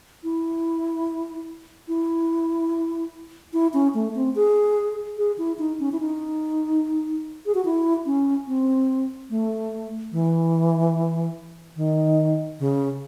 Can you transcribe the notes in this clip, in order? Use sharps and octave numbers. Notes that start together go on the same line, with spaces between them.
E4
E4
E4
C#4
A3
C4
G#4
G#4
E4
D#4
C#4
E4
D#4
G#4
F#4
E4
C#4
C4
A3
E3
D#3
C#3